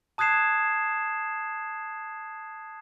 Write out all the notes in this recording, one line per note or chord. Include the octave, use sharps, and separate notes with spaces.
A5 D#6 F#6 G#6 C7 E7